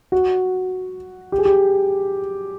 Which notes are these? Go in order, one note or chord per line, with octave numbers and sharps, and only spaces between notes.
F#4
G4
G#4
G4